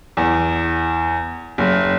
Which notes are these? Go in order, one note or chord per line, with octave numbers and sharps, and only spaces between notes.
E2
F#1